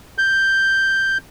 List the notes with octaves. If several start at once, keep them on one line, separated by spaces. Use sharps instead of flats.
G6